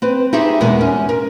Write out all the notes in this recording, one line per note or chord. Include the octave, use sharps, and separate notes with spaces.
C4 B4
D#4 E4 G4 G#4 C5 E5
E2 B2 G#3 A#4 D#5 G#5
C#4
A#4